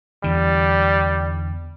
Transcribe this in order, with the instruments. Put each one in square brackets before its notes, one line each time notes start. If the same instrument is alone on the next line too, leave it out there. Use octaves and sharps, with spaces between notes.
[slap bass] E2 D3 [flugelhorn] G3